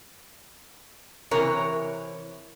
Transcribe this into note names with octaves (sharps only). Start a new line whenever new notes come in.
C3 E3 A#4 C#5